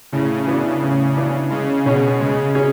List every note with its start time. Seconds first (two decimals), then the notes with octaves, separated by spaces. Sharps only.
0.12 A2 C#3
0.47 E3 B3 D4
0.82 A2
1.16 E3 B3 D4
1.51 C#3 G#3
1.85 B2 C#4 G#4 C#5
2.20 C#3 G#3
2.55 C#4 G#4 C#5